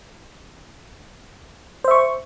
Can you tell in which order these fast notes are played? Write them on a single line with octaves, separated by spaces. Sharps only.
C5 E5 C#6